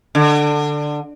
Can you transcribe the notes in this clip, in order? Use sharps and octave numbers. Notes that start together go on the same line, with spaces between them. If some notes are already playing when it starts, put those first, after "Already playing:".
D3